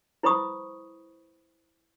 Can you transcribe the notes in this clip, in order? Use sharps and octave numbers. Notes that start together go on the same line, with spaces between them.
E4 B4 C5 B5 C#6 D#6